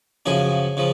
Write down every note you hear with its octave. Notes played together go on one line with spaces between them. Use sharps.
F#2 C#3 F3 G#4
C#3 F3